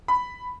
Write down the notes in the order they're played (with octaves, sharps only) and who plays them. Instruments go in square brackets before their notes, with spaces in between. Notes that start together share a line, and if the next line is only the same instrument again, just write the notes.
[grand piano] B5